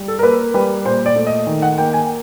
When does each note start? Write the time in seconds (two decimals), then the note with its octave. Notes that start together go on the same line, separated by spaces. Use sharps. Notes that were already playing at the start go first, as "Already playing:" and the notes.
Already playing: G3
0.08 A4
0.19 A#4
0.23 A#3 B4
0.54 G3 B4
0.85 A#2 C5
1.06 D5
1.16 A3
1.27 D#5
1.47 D#3
1.62 F#5
1.78 A#3 G5
1.93 G#5